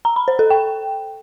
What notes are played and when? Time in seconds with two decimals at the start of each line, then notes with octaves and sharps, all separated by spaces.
0.05 A#5
0.16 B5
0.28 C5
0.39 A4
0.50 G5